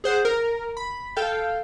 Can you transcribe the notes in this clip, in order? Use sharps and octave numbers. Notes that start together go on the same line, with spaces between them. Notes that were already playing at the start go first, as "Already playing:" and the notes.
G#4 C5 F#5
A#4
B5
A4 F5 G5